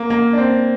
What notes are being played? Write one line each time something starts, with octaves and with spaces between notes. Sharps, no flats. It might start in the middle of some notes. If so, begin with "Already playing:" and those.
Already playing: A#3
A#3
D4
C4